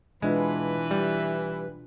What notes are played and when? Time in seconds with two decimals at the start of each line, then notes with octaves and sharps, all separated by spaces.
0.22 B2 E3 G#3 D4 F4 B4
0.91 G3